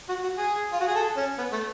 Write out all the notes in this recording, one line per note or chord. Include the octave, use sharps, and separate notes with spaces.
F#4
F#4
G#4
F4
F#4
G#4
A4
C#4
B3
A3